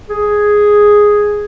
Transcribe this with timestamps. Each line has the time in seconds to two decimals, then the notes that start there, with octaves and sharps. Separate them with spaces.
0.10 G#4